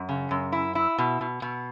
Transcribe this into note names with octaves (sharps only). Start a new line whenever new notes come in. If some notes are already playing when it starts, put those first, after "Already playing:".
Already playing: F#2
C#3
F#2
E4
E4
B2
B2
B2